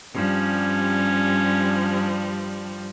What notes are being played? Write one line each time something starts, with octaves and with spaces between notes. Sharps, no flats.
G2 F3 G3 C#4